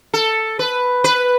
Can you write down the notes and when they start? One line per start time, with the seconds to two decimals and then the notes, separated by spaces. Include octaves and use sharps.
0.14 A4
0.59 B4
1.04 B4